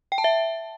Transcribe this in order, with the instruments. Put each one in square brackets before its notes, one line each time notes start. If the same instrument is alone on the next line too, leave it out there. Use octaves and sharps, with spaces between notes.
[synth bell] G5
A5
E5